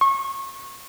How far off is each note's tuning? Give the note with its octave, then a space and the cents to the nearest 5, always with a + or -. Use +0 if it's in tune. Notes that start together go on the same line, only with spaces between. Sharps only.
C#6 -25